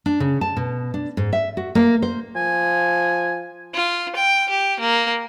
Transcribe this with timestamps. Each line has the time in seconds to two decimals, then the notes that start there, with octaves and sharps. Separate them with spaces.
0.06 D4
0.20 C#3
0.41 A5
0.57 B2
0.94 D4
1.17 G#2
1.33 E5
1.57 F#4
1.75 A#3
2.02 C5
2.36 F3 G#5
3.74 F4
4.16 G5
4.49 G4
4.80 A#3